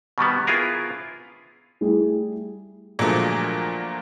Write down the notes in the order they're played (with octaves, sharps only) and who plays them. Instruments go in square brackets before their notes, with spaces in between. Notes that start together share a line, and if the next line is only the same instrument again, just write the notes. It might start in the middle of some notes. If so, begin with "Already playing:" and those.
[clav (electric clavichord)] B2 D#3 G3 B3
B3 E4 F4 G#4 A#4
[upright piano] G3 A3 E4 G4 G#4
[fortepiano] A#2 D3 F3 F#3 G#3 A3